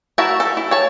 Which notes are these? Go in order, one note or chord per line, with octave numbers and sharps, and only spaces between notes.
E4 F#4 A#4 E5 A5
A4
E4
C#5 A5